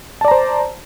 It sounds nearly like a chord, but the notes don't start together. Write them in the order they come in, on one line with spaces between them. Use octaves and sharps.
A5 D5 A#5 C5